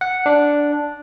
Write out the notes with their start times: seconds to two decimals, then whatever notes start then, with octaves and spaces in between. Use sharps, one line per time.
0.01 F#5
0.26 D4